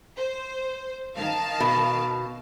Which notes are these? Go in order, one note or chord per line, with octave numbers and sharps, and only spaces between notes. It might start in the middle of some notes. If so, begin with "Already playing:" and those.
C5
D#3 F5 A5
B2